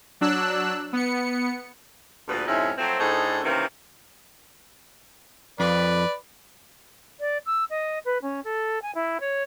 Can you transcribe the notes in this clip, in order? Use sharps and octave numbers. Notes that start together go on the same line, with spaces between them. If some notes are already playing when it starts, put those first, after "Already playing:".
F#3 D4 E6 F#6
B3 C#7
D2 A#2 G3 B3 B4
F2 G#2 C3 C#4 D#4 E4
F3 F#3 A3 C4
A2 D4 D#4 G#4 A4 C5
C3 D#3 E3 A#3 C4 C#4
F2 B4 D5
D5
E6
D#5
B4
C#4
A4
G#5
E4
C#5